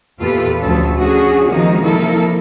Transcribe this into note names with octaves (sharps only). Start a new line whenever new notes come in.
E2 A#2 F4 G4 A4 B4
D2 F3 C#4 A4
C#4 D4 F#4 G#4
C3 D#3 F3 G#3 A#3 D#4
F3 A#3 E4 A4 A#4